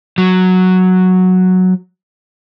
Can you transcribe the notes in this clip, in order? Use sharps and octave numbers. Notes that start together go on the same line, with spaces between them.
F#3